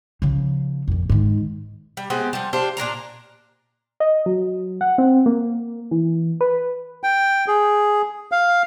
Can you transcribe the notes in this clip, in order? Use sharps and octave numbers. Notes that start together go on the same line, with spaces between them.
C#3 F3
F2 A#2
G#2 D#3
G3
G#3 B3 C4 G4
F3 G3
D4 F4 G4 C5
A#2 D4 A#4 A#5
D#5
F#3
F#5
C4
A#3
E3
B4
G5
G#4
F5